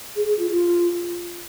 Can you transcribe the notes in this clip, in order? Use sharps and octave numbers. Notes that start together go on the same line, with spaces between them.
G#4
G#4
F4
F4